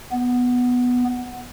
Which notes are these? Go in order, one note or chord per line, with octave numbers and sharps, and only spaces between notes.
B3